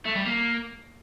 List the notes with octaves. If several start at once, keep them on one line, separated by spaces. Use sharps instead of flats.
A3
G3
A#3